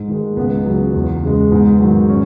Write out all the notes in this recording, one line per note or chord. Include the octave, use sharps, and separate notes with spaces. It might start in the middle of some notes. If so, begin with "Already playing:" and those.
Already playing: G#2
D#3 G#3
A#3
C#2 B3
C#3 F#3
E2
C#3 G#3
G#2 B3
D#3 F#3
C#4